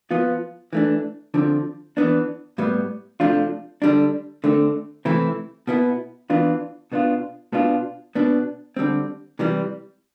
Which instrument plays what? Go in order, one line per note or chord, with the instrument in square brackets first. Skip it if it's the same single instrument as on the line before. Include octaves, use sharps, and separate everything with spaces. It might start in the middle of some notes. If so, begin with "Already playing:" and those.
[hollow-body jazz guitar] F3 B3 F4
E3 A3 D4
D3 F3 C4
E3 B3 D4
A2 G3 B3
C3 F3 A3 D4 F4
D3 G3 D4
D3 A3 C4
C3 E3 A3 C4 E4
B2 B3 E4
E3 B3 D4 F4
B2 B3 D4 F4
B2 B3 D4 F4
B2 B3 D4
D3 G3 C4
C3 E3 G3